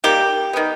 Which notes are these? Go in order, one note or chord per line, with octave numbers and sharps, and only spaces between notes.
D#3 G3 A#3 G4
D#3 G3 B3